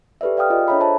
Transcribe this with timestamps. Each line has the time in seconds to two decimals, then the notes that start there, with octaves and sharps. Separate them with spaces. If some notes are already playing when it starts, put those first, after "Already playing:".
0.21 G4 A4 B4 D5 E5
0.37 D5 F5 G5 D#6 F6
0.50 F4 G#4 D#5
0.68 D4 A4 C#5 E5 A#5 B5
0.80 G#4 C5 E5 A5